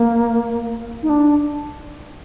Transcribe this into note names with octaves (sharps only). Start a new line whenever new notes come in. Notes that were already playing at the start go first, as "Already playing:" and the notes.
Already playing: A#3
D#4
D4